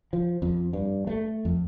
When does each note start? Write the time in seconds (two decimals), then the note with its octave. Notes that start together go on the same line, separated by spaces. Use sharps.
0.13 F3
0.42 F2
0.73 G2
1.07 A3
1.45 F2